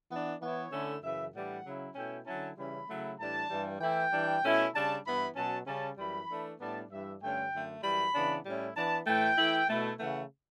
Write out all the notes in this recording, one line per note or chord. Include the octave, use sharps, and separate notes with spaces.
E3 B3 D4
E3 B3 E4 C#5
D3 A3 C#4 E4
F#2 C#3 E3 E5
A2 E3 G3 D4 F#5
C#3 F#3 C#4 E4
B2 A3 C#4 E4 G5
D3 F#3 C#4 E4 A5
C#3 E3 G3 C#4 E4 B5
C#3 F#3 A3 E4
A2 E3 G3 D4 A5
G2 E3 G3
E3 A3 E4 G5
E3 G3 D4
B2 A3 C#4 E4
C#3 G3 D4 A5
G2 E3 B3 E4 B5
B2 F#3 C#4 A5
C#3 G3 C#4 A5
F#2 E3 G3 B5
E3 A3 D4
A2 G3 B3 D4 A5
G2 E3 G3 D4 E5
G2 D3 A3 C#4 G5
F#2 D3 A3
F#2 E3 G3 B5
C#3 E3 B3 D4
A2 G3 C#4 E4
E3 B3 D4 A5
A2 E3 A3 G5
E3 A3 E4
B2 A3 E4
C#3 E3 A3 F#5